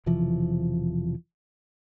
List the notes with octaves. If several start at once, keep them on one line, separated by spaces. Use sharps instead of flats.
E1 C3 E3 F3